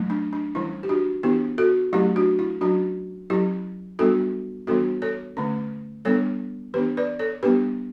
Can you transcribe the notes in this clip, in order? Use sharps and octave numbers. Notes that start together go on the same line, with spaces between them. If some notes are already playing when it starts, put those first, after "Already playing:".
Already playing: F#3 A3 C#4
D4
D4
E3 G3 C#4 E4
G4
D4 F#4
E3 B3 D4 E4 G4
F#4 A4
F#3 A3 C#4 E4 G4
D4 F#4
E4
F#3 C#4 D4 F#4
F#3 C#4 E4 G4
G3 B3 D4 F#4 A4
E3 G3 B3 D4 F#4 A4
A4 C#5
D3 A3 C#4
G3 B3 D4 A4 C#5
E3 B3 D4 G4 B4
B4 D5
A4 C#5
G3 B3 D4 G4 B4